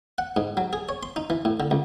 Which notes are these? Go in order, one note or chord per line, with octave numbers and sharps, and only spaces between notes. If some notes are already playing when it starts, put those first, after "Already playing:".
F#5
G#2
F#3
G#4
C#5
C6
D#4
E3
A2
D3
C#2